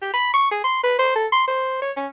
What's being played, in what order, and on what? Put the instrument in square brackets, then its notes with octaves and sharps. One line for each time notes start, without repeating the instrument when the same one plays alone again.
[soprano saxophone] G4
B5
C#6
G#4
C6
B4
C5
A4
C6
C5
C#5
C#4